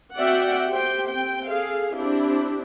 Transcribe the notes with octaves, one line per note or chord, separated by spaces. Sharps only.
C4 F#4 D5 E5 F#5 G5
G4 C5 G5
C4 G5
G#4 A4 F5
C4 D4 E4 G4